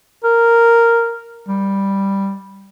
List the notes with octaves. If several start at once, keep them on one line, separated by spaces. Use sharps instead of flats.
A#4
G3